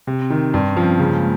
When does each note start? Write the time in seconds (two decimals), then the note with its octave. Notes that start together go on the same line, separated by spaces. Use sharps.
0.07 C3
0.22 C4
0.30 D#3
0.38 C4
0.54 G2 C4
0.69 C#4
0.77 F3
0.84 C4
0.99 C#3 A#3
1.15 G#3